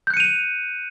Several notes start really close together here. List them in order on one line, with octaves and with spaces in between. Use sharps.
G6 F#6 C#7 D#7 F7